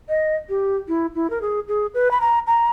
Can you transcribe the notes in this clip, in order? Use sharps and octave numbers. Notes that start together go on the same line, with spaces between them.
D#5
G4
E4
E4
A#4
G#4
G#4
B4
B5
A#5
A#5